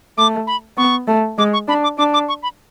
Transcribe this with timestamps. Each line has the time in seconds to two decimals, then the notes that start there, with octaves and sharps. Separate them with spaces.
0.18 A3 D6
0.47 B5
0.77 B3 C#6
1.08 A3
1.38 G#3 D6
1.53 C#6
1.68 D4 B5
1.83 D6
1.98 D4 D6
2.14 D6
2.29 C#6
2.43 B5